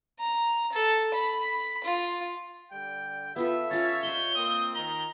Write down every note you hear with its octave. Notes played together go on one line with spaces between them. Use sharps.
A#5
A4
B5
F4
D3 G3 G5
B3 F4 A4 E5
C#4 F4 C#5 F#5 A6
C5 D#5 B5 G7
A#3 C4 D#6
D#3 A#5 G7